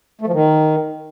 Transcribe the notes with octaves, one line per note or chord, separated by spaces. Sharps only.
A3
F3
D#3